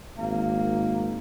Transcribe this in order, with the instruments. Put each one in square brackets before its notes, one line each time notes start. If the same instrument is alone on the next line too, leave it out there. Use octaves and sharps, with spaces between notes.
[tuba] G#1 [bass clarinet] A#3